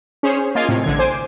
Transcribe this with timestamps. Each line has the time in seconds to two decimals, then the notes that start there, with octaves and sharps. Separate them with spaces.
0.23 C#4 G#4 C5 C#5
0.55 A#3 F4 D#5 F5 G#5
0.69 A2 C3
0.84 A1 D3 G#6
0.99 C5 G#5 D6